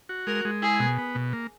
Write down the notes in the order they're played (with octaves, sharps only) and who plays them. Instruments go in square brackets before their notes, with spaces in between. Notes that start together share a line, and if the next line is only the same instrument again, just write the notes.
[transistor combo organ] F#4
[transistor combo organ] G#3 [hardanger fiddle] A#4
[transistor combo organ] G#3
[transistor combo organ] E4 [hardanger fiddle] G#4
[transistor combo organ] B2
B3
B2
A#3